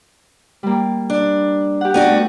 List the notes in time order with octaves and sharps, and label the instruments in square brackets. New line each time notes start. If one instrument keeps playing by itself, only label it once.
[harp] G3 A#3
[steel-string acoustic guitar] D4
[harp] G4 F#5
[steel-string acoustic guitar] B3 D4 F#4
[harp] A3